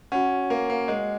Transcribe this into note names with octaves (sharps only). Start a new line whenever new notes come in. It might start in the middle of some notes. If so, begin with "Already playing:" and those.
C#4 F#4 C#5 F#5
A#3
A#3
G#3